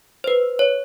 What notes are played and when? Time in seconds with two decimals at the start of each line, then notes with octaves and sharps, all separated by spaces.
0.24 B4 C5
0.59 C#5